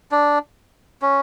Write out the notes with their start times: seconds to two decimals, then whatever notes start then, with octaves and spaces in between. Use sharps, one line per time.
0.11 D4
1.02 C#4